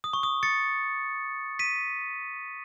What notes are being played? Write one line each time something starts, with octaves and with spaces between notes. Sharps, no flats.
D#6
C#6
D#6
A6 C#7
B6 D#7